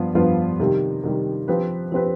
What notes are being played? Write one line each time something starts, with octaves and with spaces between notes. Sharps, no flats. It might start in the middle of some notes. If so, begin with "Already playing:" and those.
Already playing: G2 F3 B3 F4
G2 F3 B3 F4 B4
C3 D#3 G3
C3 D#3 G3
F3 C4 G4 B4
F3 C4 G4 B4